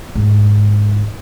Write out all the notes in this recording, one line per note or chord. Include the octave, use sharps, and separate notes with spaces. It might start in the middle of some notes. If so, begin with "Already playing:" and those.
G#2 D3